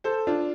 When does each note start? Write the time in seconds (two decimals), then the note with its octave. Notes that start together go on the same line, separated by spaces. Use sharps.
0.04 A4 C5
0.27 D4 F4